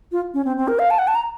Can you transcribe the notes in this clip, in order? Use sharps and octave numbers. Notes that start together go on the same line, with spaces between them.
F4
C#4
C4
C4
A#4
F5
A5
F#5
A5
A#5